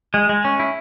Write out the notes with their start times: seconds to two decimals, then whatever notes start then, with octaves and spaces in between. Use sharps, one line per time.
0.14 G#3
0.29 G#3
0.45 C#4
0.59 E4